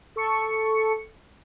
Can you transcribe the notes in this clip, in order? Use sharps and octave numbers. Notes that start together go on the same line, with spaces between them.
A4 C#6 C#7